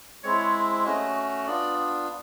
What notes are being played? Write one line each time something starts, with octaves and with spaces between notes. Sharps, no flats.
G#3 C4 E4 C#5
A3 C#4 F#4 D#5
B3 D4 F4 D5